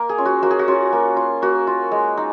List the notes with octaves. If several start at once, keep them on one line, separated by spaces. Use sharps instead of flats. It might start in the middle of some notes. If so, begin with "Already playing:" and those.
Already playing: A#3 A#4
G#4
C#4 F4
F#4
A#3 F#4
G#4
F#4
C#4 F4
A#3
F4
A#3 F#4
F4
G#3
D#4